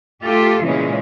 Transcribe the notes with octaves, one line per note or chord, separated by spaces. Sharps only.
A3 F4 G4 A4
A#2 C#3 E3 G#3 C#4